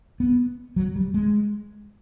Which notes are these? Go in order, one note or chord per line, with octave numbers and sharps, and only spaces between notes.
B3
F#3
G3
G#3